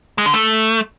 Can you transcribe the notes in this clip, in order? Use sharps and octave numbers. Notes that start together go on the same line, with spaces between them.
G#3
D3
A3